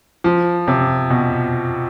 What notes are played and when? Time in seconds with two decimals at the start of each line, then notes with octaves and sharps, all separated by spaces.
0.24 F3
0.68 C3
1.10 B2